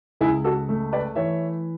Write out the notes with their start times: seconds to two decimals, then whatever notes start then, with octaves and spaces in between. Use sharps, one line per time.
0.21 C#2 E4 G#4
0.44 F#4 A4
0.69 A3
0.93 B4 D5
1.15 E3 C#5 E5